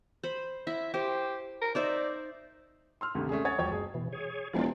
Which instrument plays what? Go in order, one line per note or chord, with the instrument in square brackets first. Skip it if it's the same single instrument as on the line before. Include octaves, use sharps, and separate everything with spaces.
[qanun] C5 B5
[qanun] E4 [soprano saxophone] E5
[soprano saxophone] G4 [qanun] C5
[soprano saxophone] A#4
[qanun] D#4 C5 E5 [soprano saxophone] D5
[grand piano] C6 E6 F6
D2 G2 C3 D#3
A3 C#4 D4 G#4
C#5 F#5 G#5 D#6 G#6 A6
E1 F3 C#5 G5 G#6
F#1 G#4
[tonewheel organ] B2 E3
G#4 C#5
[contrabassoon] E1 [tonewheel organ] F3 F4 D5